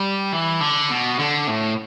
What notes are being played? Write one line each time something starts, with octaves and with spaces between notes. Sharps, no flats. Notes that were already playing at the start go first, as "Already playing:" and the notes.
Already playing: G3
E3
D3
B2
D3
A2